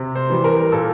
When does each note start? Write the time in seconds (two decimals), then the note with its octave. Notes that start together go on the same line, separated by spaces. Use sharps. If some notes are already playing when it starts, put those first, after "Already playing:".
Already playing: C3
0.15 C5
0.30 E3 G3
0.44 A#4
0.72 A#2 A4